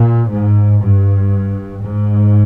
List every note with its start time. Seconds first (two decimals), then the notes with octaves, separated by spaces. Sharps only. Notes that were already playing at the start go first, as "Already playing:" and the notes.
Already playing: A#2
0.31 G#2
0.82 G2
1.85 G#2